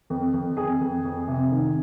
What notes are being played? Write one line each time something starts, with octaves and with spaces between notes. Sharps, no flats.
F2
F2
F2 G#4
F2
F2
C3
D#3